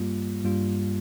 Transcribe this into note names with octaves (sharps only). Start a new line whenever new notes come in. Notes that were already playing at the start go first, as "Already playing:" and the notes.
Already playing: G2 G3 A#3 F4
G2 G3 A#3 F4